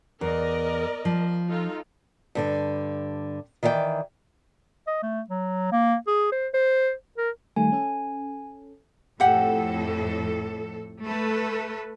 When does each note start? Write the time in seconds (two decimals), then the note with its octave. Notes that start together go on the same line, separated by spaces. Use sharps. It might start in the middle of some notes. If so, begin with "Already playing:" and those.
0.21 E2 A#4 D5 D#5
1.05 F3
1.49 D#4 F4 A4
2.35 G2 D3 D5
3.63 D#3 E3 D5 E5 G5
4.87 D#5
5.02 A3
5.29 F#3
5.72 A#3
6.07 G#4
6.32 C5
6.54 C5
7.17 A#4
7.56 D#3 G3 A3 G#5
7.72 C#4 A4
9.20 F2 A2 G4 A4 F#5
11.04 A3 A4 B4